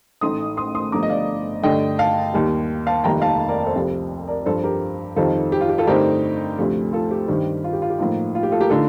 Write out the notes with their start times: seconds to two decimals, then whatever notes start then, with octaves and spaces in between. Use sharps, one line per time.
0.21 A1 A2 A3 D#4 C6 D#6
0.57 C6 D#6
0.75 C6 D#6
0.92 G1 G2 F3 A3 A#5 D6
1.03 D#5
1.10 D5 F5
1.63 G2 D3 A3 D4 D#5 G5
1.99 F5 A5
2.34 D#2 D#3 G3
2.87 F5 A5
3.04 F1 F2 D#3 G3 A#3 G5 A#5
3.22 F5 A5
3.49 A#4 D5
3.66 A4 C5
3.75 C2 C3 F3
4.28 A#4 D5
4.46 G2 F3 C4 A4 C5
4.63 G4 A#4
5.16 F2 D#3 G3 C4 D#4 F4 A4
5.52 G4
5.61 F4
5.69 G4
5.78 F4 A4
5.87 G2 D3 A3 C4 D#4 G4 A#4
6.58 D2 C3 F3 A3
6.93 F4 A4
7.11 G4
7.28 G2 D#3 G3 C4 G4
7.64 F4
7.73 G4
7.82 F4
7.90 G4
7.99 A2 F3 A#3 D#4 F4
8.35 F4
8.43 G4
8.52 F4 A4
8.61 G4 A#4
8.69 D3 A3 D#4 F4 A4